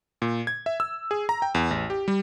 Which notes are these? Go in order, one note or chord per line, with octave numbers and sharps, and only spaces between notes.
A#2
G#6
E5
E6
G#4
A#5
G5
E2
A1
G4
G3